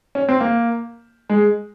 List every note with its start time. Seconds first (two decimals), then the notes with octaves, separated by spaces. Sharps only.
0.15 C#4
0.29 C4
0.41 A#3
1.30 G#3